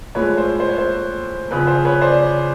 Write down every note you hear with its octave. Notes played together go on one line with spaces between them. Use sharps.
A2 F3 G#3 B4 C#5
C5
C5
C#5
C5
E2 C#3 F3 B4
C5
B4 C#5
C5 D5